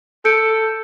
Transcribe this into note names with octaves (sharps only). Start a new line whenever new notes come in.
A4 G6 C#7 D7